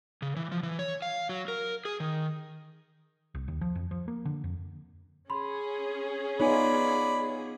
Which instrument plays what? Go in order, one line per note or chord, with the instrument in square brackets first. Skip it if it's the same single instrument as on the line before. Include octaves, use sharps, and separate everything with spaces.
[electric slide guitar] C#3
E3
F3
E3
C#5
F5
F#3
A#4
G#4
D#3
[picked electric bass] C2
D#2
F3
F2
F3
A#3
D3
F2
[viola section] C#4 G#4 [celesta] B5 C6
[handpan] B3 D#4 F4 [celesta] C#5 G#5 [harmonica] D5 B5